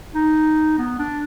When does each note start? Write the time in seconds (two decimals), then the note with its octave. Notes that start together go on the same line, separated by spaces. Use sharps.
0.15 D#4
0.78 B3
0.99 D4